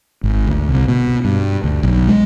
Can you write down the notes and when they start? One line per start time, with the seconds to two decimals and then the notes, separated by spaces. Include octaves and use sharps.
0.24 G#1
0.47 D2
0.69 C2
0.88 B2
1.25 G2
1.64 D2
1.83 B1
2.08 G#3